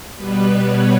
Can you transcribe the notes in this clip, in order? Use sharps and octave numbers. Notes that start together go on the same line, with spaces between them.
B2 G3 B3 B4
C#5